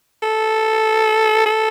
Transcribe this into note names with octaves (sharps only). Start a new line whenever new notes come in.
A4
A4